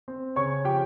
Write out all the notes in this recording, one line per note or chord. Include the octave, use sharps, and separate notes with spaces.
C4
C#3 C#5 C#6
F3 G4 G5